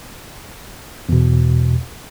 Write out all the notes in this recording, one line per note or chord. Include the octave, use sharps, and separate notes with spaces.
E2 B2